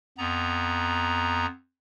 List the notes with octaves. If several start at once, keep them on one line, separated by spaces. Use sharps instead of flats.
F2 B3 A#5